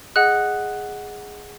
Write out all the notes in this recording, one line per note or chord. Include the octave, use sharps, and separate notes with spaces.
G#4 D#5 F#5 F#6